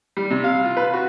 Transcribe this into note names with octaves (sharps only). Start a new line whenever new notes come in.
G3
C3
F5
F4
B4
F#4